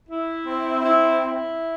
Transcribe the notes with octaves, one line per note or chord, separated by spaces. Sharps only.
E4
C4
E4
E4